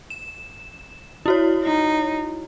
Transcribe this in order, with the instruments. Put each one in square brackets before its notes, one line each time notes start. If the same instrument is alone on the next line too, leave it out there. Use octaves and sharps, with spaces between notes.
[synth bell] E7
E4 F#4 C#5
[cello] D#4